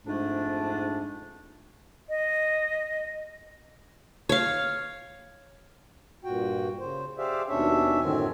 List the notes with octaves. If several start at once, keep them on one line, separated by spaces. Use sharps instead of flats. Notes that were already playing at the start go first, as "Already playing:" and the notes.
F2 G#2 A3 D4
D#5
C#5 F5
G2 A#2 F#4 G5
C#3 C5
G4 G#4 C5 D5 E5 F5
D#2 B2 C#4 D4 C#5 E5
F#2 A2 D3 D#3 C4 G#5